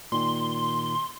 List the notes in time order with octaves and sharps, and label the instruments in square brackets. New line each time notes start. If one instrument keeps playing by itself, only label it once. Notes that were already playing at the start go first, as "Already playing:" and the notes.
[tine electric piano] A#2 D#3 [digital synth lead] C6